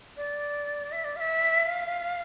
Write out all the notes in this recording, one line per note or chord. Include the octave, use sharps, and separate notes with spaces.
D5
E5
D5
F5
E5
F5